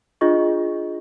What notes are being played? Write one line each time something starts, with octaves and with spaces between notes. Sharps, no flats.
D4 F4 G#4 D#5 C#6